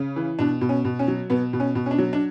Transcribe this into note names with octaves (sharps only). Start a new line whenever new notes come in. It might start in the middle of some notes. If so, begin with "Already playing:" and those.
Already playing: C#3
E3
B2 D4
B2
C#4
B2
C#4
F#3
B2 B3
B2
C#4
B2
C#4
D4
F#3
D4